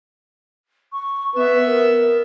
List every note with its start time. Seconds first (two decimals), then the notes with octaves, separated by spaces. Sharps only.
0.92 C#6
1.35 B3 B4 E5
1.66 A#4